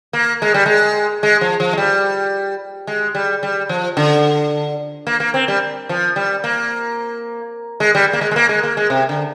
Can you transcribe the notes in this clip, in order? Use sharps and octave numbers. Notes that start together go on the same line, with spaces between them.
A#3
G#3
G3
G#3
G#3
F3
F3
G#3
G3
G#3
G3
G3
F3
D3
A#3
A#3
C4
G3
F3
G3
A#3
G#3
G3
A#3
G#3
G#3
A#3
G#3
A#3
G#3
C3
D3